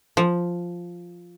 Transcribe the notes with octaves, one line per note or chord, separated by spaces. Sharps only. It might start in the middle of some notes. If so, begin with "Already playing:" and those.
F3